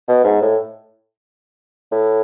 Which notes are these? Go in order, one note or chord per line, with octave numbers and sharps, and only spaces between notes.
B2
G#2
A2
A2